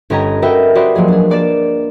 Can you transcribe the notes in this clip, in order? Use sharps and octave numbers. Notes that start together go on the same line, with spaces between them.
G1 C#4 G4 D#5 A#5 G#6
F#4 A#4 B4 D#5 E5 G5
F#4 G4 B4 C5 D5 D#5
F3 F#3 A#3 G#4
D4 G#4
A#3 D5 D6 A6 E7